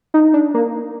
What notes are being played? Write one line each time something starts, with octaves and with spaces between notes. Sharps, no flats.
D#4
D4
A#3